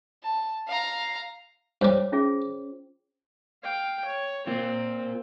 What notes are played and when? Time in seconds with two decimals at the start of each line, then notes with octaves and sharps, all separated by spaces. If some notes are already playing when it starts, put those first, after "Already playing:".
0.23 A5
0.68 F5 A#5
1.81 G2 G3 C5 C#5 D6
2.12 C#4 F4 G#4
3.63 F5 G5
4.05 C#5
4.47 A#3 C4 F4